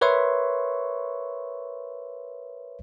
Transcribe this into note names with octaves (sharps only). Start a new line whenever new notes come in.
A#4 B4 C#5 E5 C6 C#6